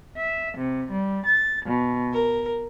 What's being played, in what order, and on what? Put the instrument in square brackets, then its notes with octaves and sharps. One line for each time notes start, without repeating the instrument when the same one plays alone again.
[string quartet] E5
C3
G3
A6
B2
A#4